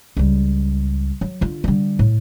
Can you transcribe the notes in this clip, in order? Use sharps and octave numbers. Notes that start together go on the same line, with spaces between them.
C#2 G3
F#3
D3 F4
D3 G3
A2